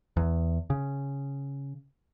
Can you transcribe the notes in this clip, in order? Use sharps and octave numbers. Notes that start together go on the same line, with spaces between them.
E2
C#3